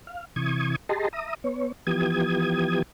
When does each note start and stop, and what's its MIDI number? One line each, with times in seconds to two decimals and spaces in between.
0.07 0.25 77
0.36 0.76 48
0.36 0.76 52
0.36 0.76 85
0.36 0.76 87
0.36 0.76 92
0.89 1.08 67
0.89 1.08 68
0.89 1.08 75
0.89 1.08 81
0.89 1.08 82
0.89 1.08 84
1.13 1.35 76
1.13 1.35 82
1.13 1.35 87
1.44 1.72 59
1.44 1.72 73
1.87 2.82 52
1.87 2.82 53
1.87 2.82 59
1.87 2.82 67
1.87 2.82 87
1.87 2.82 92